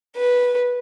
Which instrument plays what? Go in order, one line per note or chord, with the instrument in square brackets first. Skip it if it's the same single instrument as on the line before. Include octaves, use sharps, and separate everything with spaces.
[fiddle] B4